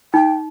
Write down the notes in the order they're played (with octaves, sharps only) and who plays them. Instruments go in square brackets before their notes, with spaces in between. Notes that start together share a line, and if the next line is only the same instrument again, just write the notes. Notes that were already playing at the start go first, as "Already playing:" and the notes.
[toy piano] D#4 [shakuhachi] G5